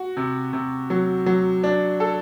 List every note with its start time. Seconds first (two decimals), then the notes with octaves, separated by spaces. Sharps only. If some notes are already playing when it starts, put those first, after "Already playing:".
Already playing: F#4
0.17 C3
0.53 C3
0.90 F#3
1.26 F#3
1.64 D4
2.00 A4